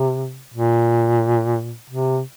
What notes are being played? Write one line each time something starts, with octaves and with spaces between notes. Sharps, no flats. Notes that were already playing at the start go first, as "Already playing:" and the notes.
Already playing: C3
A#2
C3